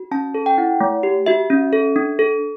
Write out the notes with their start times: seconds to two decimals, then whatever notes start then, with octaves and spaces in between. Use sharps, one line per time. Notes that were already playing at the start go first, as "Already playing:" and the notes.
Already playing: F#4
0.11 C#4 A5
0.34 A4
0.46 G5
0.58 E4 F#5
0.80 A3
1.03 G4
1.26 F#4 E5
1.50 C#4
1.73 A4
1.96 D4
2.19 A4